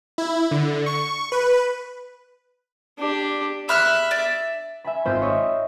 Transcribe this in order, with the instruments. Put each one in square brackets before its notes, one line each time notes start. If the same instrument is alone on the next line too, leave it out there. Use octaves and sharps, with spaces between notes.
[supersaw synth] E4
D3
C#6
B4
[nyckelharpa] D4 G4
[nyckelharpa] E5 [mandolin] B5 F6 F#6
[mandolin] D5
[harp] E5 G#5 B5
G#1 C4 F4 C5 B5 G6
C#5 D#5 E5